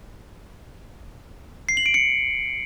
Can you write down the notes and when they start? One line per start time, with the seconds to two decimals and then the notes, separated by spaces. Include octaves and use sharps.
1.69 C7
1.77 F#7
1.86 D7
1.94 C#7